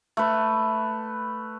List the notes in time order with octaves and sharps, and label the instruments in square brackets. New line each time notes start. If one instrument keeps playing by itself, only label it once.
[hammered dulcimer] A3 B4